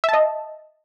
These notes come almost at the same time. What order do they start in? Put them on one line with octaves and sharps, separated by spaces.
E5 A5 D#5